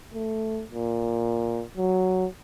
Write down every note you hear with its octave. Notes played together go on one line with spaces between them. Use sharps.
A3
A#2
F#3